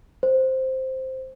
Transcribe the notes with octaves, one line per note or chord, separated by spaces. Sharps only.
C5